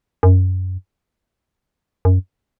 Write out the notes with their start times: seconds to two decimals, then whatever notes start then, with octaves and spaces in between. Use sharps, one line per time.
0.23 F#2
2.05 F#2